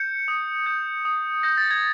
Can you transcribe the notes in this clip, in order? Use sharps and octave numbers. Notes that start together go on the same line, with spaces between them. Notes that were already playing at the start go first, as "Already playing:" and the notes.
Already playing: G6 C#7
D#6
G6
D#6
G6 A#6
A6
G#6